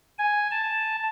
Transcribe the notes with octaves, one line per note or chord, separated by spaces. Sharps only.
G#5
A5